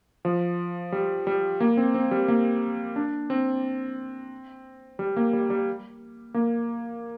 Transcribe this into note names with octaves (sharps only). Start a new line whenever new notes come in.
F3
G3
G3
A#3
C4
C4
G3
A#3
D4
C4
G3
A#3
G3
G3
A#3